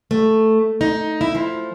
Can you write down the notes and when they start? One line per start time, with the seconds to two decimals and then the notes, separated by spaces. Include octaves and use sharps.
0.11 A3
0.81 D#4
1.21 E4
1.35 F3